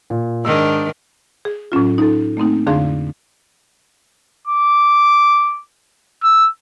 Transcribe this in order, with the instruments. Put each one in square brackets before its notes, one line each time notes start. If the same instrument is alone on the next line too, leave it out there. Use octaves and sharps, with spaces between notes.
[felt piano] A#2
[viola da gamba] G#2 D#3 D4 [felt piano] E6
[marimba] G#4
A2 F#3 C#4 F4
D#4 A4
A3 A#3 C4 D#4
F2 D3 D4 G#4 F5 C6
[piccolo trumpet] D6
E6